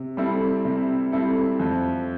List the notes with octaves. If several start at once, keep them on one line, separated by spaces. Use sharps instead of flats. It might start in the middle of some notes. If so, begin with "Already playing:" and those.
Already playing: C3
G3 C4 E4 A4
C3
G3 C4 E4 A4
F2